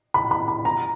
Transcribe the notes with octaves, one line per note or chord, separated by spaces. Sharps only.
B5
B5
B5
A#5